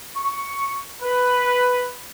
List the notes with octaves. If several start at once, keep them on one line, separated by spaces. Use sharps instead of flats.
C#6
B4